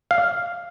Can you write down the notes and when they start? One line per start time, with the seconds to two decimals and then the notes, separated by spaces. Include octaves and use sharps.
0.11 F5